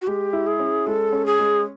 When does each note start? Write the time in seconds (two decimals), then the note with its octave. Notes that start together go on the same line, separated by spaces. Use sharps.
0.02 F#4
0.07 G#3 G4
0.33 E4
0.47 G#4
0.59 C#4
0.87 G#3 A4
1.12 C#4
1.26 G#4
1.39 G#3